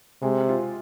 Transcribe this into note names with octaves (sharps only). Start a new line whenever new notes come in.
C3 G#3
F4